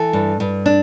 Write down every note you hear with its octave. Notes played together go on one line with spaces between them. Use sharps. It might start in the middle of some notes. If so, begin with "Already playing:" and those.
Already playing: E3 A4
G2
G2
D4